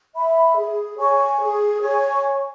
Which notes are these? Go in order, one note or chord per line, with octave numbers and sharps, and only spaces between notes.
E5 B5
G#4
C#5 G#5 C#6
G#4
C#5 G#5 C#6